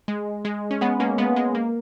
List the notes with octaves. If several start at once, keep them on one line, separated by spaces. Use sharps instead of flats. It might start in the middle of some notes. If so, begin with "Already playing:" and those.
G#3
G#3
C#4
G#3 B3
A#3 C#4
G#3 B3
G#3
A#3